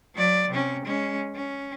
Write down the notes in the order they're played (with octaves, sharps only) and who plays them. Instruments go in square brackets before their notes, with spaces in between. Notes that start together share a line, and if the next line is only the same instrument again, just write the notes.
[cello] F#3 D5
C3 C#4
G#3 C#4
C#4